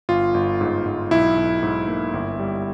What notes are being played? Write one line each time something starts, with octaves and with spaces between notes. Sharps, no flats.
G1 F4
G1
G#2
G#2
B1 E4
B1
G#2
A#3
G1
G3